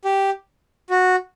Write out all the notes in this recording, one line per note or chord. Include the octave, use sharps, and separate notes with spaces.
G4
F#4